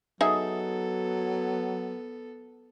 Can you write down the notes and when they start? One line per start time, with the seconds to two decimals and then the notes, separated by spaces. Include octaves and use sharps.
0.21 F#3 B3 D#4 G#4 A4 E5